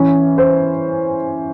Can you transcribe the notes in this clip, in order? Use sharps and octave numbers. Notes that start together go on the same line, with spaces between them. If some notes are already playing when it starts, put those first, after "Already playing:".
Already playing: E3 C#4
C5